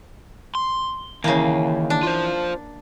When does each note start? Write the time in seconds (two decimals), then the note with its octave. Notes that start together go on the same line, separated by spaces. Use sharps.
0.55 C6
1.24 D#2 C#3 E3 A#3 E4
1.90 D4
2.03 F4 C5